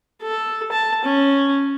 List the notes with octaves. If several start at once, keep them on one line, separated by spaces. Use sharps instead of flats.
A4
A5
C#4